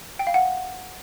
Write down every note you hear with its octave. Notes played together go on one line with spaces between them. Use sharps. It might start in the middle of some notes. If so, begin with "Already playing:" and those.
G5
F5
F#5